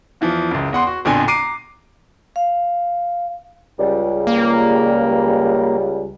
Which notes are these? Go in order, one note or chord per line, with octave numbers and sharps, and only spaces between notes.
E2 E3 F3
C#2 F#2
E2 F#5 C6
F#4
A#1 F2 B2 D3 G#5
A#5 D6 C7 D7 D#7
F5
C#2 G3
A#3